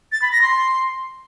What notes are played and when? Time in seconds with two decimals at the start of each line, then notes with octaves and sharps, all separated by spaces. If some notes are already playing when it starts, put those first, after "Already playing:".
0.12 A6
0.22 B5
0.32 A#6
0.42 C6